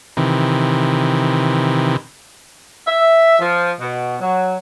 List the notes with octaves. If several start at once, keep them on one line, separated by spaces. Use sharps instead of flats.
C3 D#3 E3
E5
F3
B2
F#3